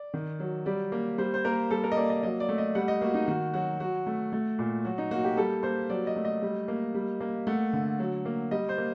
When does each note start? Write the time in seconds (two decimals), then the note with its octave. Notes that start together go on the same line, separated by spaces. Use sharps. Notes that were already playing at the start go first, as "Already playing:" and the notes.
Already playing: D5
0.14 D#3
0.39 F#3
0.66 G3 D5
0.92 A#3
1.18 G3 C5
1.34 C5
1.45 A#3 A#4
1.70 G3 A4
1.84 A#4
1.92 D#5
1.97 A#3 D5
2.10 D#5
2.23 F#3 D#5
2.40 D5
2.49 A3
2.58 D#5
2.75 G3 F#5
2.88 D#5
3.01 A#3 F#4
3.14 D#4
3.27 D#3 F#4
3.54 F#3 F#4
3.80 F#3 F#4
4.07 A3
4.32 A3
4.59 A#2
4.85 F#3 F#4
4.98 D#4
5.11 A#3 F#4
5.24 G4
5.37 G3 A4
5.63 A#3 C5
5.89 F#3 D5
6.07 D#5
6.16 A3
6.25 D#5
6.42 G3
6.68 A#3
6.94 G3
7.21 A#3
7.47 A3 F#5
7.73 D3
7.99 F#3
8.25 A#3
8.51 G3 D#5
8.69 C5
8.78 A#3